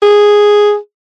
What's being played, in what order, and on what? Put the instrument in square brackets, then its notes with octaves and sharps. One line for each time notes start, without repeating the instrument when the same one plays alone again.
[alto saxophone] G#4